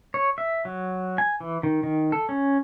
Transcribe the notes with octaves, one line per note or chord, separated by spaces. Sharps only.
C#5
E5
F#3
G#5
E3
D#3
D#3
A4
C#4